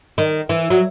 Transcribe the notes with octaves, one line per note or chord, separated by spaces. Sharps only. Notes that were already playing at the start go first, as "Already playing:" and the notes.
D#3
E3
F#3